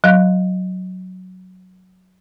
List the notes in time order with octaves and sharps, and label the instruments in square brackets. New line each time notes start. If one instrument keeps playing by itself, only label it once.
[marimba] F#3 F5 F#6